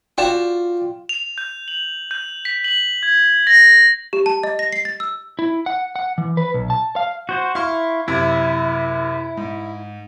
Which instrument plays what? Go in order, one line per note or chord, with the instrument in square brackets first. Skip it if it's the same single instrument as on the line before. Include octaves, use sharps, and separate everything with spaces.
[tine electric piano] F4 [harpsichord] F#4 D5 [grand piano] G5 E7
[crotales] F7
G6
F#7
G6
B6
F#7
G#6
A#6
[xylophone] G4
A5
D#5
A#6
C7
A6
E6
[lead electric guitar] E4
F#5
F#5
E3
B4
B1
A5
F5
[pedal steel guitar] F#4 C5
[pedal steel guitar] E4 [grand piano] F5 C6 C#6
[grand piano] F#2 C3 [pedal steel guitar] E4
[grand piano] G#2